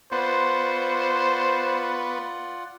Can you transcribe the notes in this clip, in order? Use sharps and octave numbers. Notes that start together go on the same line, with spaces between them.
B3 F4 B4 C5 D5 F#5 C#6